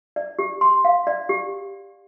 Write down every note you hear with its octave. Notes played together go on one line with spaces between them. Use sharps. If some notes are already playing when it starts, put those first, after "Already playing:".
D5
G4
C6
F5
D5
G4